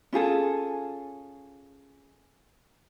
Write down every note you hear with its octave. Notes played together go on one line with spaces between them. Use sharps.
C#4 F4 G#4 A4